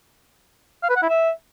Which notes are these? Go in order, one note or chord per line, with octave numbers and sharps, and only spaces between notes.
F5
B4
F#5
E4
E5